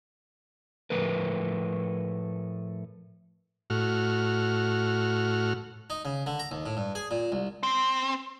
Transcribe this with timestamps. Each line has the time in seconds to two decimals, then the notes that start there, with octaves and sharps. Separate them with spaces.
0.90 A2 F3 A3 A#4 B4
3.70 A2 F#4 F6
5.90 D#4
6.05 C#3
6.26 D3
6.39 A#5
6.51 D#2
6.66 A2
6.77 G2
6.95 G#4
7.11 A#2
7.32 C2
7.63 C4